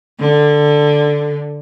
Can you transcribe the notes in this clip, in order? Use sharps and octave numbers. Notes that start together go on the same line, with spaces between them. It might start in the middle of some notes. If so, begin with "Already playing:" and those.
D3